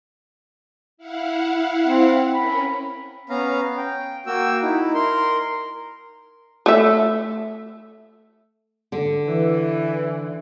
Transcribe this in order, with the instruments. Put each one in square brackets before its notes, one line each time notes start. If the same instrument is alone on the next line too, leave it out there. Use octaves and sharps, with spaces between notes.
[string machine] E4 F5 F#5
[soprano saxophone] C4
[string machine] C#4 A#4 [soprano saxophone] B5
[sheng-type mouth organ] B3 C#4 F5 A#5
G5
A#3 F#4 G5 E6
D#4 E4
A#4 C6
[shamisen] A3 E5
[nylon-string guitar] D3
[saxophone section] E3